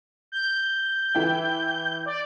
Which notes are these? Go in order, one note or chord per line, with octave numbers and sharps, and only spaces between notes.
G6
E3 E4 G5
D5